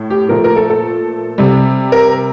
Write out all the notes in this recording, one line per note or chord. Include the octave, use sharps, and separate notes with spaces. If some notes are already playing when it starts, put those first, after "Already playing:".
Already playing: A2
G4
A#2 F3 A3 A#4
A#4
A4
A4
C3 G3
A#4